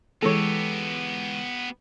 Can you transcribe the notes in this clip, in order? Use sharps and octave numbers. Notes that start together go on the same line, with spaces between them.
E3 G#3 B3 G4 A4 C#5 A#6